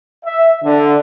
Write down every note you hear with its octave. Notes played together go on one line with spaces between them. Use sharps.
E5
D3